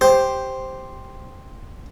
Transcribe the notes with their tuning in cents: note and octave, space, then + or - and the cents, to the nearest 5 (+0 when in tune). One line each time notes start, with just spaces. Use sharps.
G4 +0 C5 +0